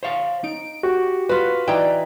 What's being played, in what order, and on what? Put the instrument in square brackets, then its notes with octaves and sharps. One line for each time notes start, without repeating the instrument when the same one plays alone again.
[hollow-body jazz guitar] C5 C#5 F5
[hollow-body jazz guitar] D#4 [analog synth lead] D7
[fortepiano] F#4 [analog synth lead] G4
[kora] F4 F#4 [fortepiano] B4
[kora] E3 D#4 [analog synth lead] D5 [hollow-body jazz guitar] G5